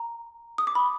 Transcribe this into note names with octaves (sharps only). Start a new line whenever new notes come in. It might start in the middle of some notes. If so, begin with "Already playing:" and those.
Already playing: A#5
D#6
D6
B5